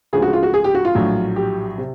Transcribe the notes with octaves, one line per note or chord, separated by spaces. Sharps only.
D2 C#3 F3 G#3 G#4
F#4
F4
F#4
G#4
G4
F#4
F4
A#1 A2 F#3
G4
C3